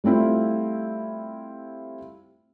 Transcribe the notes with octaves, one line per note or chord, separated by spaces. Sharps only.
G3 A3 C4 E4 F4